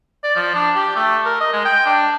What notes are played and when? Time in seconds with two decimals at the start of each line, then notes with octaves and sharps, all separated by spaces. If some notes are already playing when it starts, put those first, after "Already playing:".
0.24 D5
0.36 F3
0.55 D4
0.75 G4
0.96 A3
1.26 A#4
1.41 D#5
1.53 G#3
1.65 G5
1.86 D4